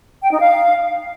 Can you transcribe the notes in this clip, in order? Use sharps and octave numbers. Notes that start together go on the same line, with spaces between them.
G5
D#4
F5